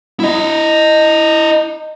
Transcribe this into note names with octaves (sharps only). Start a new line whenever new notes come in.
E4 D#5